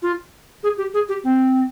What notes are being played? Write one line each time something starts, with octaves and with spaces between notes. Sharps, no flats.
F4
G#4
G4
G#4
G4
C4